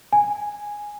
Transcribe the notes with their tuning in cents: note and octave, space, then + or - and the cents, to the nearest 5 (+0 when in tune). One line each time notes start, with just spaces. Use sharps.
G#5 -5